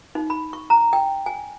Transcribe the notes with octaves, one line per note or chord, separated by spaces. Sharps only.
D#4
B5
C#6
A#5
G5
G#5